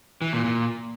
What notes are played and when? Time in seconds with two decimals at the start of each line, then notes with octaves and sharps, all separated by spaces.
0.22 E3
0.33 A#2
0.44 A#2